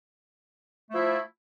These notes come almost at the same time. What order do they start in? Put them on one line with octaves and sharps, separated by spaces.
A3 F3 E4